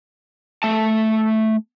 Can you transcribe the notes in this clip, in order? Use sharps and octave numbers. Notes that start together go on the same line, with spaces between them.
A3 A5